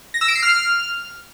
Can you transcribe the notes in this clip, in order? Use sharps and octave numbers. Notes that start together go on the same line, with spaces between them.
A#6
E6
D7
C7
F6